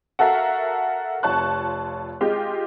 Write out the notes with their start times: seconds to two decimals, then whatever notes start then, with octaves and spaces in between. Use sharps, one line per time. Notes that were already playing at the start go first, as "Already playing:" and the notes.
0.19 F#4 A4 A#4 E5 F5
1.23 F1 F4 C#5 A5 C#6 F#6
2.21 G#3 F4 G4